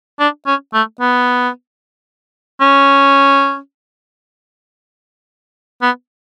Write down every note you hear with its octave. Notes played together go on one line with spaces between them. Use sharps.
D4
C#4
A3
B3
C#4
B3